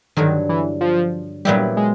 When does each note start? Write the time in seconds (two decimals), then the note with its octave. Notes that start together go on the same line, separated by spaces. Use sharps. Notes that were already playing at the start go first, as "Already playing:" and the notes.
0.17 G2 D3 D#3 F#3
0.49 E3
0.81 F3
1.45 A#2 F#3 G3 B3 E4 G4
1.77 G#3